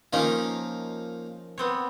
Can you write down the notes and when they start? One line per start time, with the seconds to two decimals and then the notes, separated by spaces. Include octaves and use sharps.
0.13 D#3 F3 A#3 C#4 D#4 F4
1.58 B3 C4 C#5